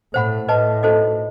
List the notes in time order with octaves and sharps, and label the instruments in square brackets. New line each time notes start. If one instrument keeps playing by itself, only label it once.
[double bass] A2 [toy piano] C5 F#5 B5
[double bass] A2 [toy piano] B4 D#5 A5
[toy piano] D#4 F#4 A4 C5 D#5